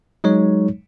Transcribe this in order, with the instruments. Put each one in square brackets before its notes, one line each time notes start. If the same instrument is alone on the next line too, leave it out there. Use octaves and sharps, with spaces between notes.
[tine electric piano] F#3 G#3 D#4 C#5